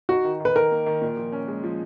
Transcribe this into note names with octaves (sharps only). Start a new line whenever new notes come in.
D#4 F#4
D#3
D#3
B4
D#3 A#4
A#3
D#3
A#2
F3
C#4
G#3
F3